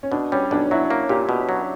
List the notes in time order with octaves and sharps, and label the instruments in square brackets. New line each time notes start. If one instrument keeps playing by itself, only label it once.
[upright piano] C#4
[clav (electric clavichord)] B2 [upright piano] D4
[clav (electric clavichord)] G3 [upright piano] C#4
[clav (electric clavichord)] B1 [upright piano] D4
[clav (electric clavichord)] F#3 [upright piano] E4
[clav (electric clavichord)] A#3
[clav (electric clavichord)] A#2 [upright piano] G4
[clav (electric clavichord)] B2
F#3